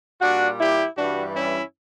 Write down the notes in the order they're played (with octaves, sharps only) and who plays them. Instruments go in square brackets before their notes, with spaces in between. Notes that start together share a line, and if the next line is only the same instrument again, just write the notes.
[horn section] A#2 G3 D4 F#4
E4 G4
G2 E3 G3 D4 F#4
C#4 E4